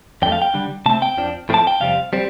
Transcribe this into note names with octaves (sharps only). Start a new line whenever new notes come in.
F2 D3 F3 A3 G5
F5
G5
D3 G3 D4
C3 A3 C4 A5
G5
F2 F3 D4
A2 F3 A3 C4 A5
G5
F2 C3 G3 C4 F5
G3 C4